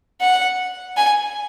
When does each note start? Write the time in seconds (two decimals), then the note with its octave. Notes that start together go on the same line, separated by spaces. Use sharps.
0.21 F#5
0.97 G#5